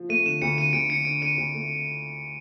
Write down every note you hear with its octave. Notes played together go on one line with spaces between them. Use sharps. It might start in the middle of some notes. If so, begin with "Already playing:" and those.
Already playing: F3
A3 D#7
D3 E7
D2 C#7
D3 D#7
D2 D7
D3 C#7
D3 D7
D3 D#7
D2
A3